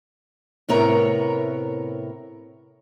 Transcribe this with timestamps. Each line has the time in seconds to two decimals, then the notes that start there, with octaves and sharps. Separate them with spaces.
0.69 A2 C3 B3 A#4 C#5 A#5